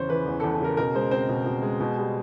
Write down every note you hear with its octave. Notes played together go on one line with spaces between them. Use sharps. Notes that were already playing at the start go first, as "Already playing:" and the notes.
Already playing: E2 C#3 C5 C#5
E3 B4
E2
A4
E2
A4
C#3 A#4
B2 A#4
G#3 C5
C4 C5
B2
B2
G#3
B2
G3